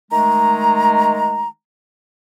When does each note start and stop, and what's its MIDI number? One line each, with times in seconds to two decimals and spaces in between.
0.11 1.48 51
0.11 1.48 56
0.11 1.48 57
0.11 1.48 82